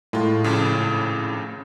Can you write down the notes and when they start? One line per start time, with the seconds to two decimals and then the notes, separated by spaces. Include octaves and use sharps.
0.13 A2 G#3 F4
0.44 G#1 F2 C#3